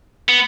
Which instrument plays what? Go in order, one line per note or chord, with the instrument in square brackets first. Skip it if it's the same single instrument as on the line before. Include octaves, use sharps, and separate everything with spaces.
[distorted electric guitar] B3